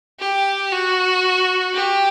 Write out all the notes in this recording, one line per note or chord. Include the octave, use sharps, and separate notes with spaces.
G4
F#4
G4